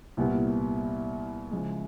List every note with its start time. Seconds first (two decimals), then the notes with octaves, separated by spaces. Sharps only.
0.17 C2 A#2 G3 B3 E4
1.51 C#3 F3 G#3